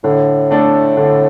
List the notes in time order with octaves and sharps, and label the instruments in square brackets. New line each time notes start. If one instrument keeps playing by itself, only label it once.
[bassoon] A2 [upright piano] D3
[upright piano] A3 D4 A4
D3